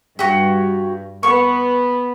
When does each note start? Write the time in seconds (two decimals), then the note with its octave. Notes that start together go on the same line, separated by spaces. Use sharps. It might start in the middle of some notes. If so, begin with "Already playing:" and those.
0.19 G2 F#4 G4
1.23 B3 C#6